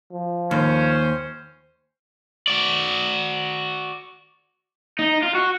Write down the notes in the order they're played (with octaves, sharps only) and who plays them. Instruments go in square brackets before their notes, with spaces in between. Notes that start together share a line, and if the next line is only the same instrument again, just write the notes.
[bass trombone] F3
[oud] D#2 [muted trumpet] C#4 [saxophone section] C5
[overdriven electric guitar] F#4 D5
D#4
F4
F#4